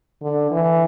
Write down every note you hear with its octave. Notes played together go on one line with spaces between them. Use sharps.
D3
E3